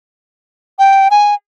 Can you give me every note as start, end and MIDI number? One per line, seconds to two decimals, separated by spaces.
0.79 1.08 79
1.11 1.34 80